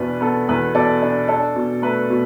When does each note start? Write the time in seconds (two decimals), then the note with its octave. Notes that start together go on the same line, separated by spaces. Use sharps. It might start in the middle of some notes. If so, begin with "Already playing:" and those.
Already playing: E2 B2 B3 D4 B4
0.21 B3 A4
0.49 E2 B4
0.74 B2 A4 D5
1.02 D4
1.28 D4 A4 D5
1.56 B2
1.82 A3 B4
2.10 B2